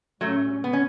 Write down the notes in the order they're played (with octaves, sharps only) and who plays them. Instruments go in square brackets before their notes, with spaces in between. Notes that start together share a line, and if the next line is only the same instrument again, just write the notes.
[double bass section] A2 G3 C#4 [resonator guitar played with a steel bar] F#3 A3
[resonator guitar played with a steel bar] B3
C#4